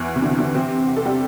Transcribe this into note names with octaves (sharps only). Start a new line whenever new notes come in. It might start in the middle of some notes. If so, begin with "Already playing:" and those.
Already playing: E2 E3
C3
D3
C3
D3
C3 C4
G4
A4
G3 G4